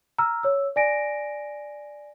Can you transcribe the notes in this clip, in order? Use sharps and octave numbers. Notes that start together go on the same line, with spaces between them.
A#5 E6 F6
C#5 E6
D5 G#5 A#6 D7